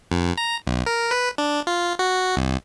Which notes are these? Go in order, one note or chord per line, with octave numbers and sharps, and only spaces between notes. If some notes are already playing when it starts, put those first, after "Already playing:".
F2
A#5
B1
A#4
B4
D4
F4
F#4
C2